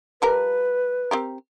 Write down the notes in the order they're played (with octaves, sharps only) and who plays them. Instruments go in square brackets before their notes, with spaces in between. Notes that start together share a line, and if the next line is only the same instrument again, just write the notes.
[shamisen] F3 G3 A#4 [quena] B4
[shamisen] C4 G4 A#4